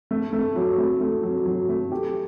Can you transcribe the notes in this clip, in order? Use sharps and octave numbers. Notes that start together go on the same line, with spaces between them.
A3
A3
F#3
A3
A3
F#3
F#3
A3
G4